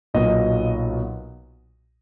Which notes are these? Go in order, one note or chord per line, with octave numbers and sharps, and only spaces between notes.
B1 A#2 F#3 B3 D#5